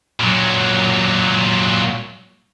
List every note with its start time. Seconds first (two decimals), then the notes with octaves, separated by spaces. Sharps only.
0.20 A#2 F#3